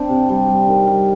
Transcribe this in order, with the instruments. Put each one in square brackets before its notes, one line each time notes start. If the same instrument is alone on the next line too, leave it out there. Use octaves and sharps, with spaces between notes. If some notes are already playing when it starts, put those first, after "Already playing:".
Already playing: [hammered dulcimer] C4 D4
C3
G3
G3
D#3
G3